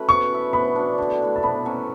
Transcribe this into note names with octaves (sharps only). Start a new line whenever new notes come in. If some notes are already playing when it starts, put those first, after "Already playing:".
Already playing: A3 C#4 F#4 B4
B3 C#6
E4 B4 E5
B3 B5
D4 F#4
D3
A3 E4 B4
A5
B2 B5
F#3 C#4 F#4